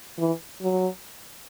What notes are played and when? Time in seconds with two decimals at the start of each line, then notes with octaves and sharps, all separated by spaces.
0.18 E3
0.62 F#3